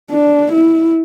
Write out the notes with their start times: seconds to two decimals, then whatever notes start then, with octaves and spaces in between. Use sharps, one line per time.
0.10 D4
0.52 E4